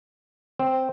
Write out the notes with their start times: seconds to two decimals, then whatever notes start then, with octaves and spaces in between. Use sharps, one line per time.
0.60 C4 C5